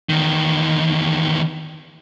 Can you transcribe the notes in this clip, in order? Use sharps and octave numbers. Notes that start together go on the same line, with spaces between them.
E2 D#3